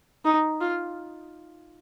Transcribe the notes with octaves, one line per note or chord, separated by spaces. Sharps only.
D#4
F4